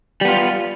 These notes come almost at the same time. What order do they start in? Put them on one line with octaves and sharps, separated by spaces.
G3 B3 F4